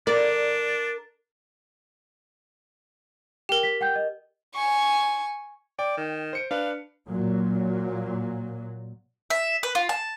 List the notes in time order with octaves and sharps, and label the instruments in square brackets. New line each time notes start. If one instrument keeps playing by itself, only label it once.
[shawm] D4 [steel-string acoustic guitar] A#4 [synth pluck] D5
[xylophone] G4 A#4 [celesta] G5
[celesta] B6
F#5 G5 G6
D#5
[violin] G#5 C#6
[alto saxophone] D5 [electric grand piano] G5
[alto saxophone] D#3
[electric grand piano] C5 C#7 D7
[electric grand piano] D4 B4 [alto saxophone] F5
[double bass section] A#2 F#3
[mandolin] E5
B4
F4
A5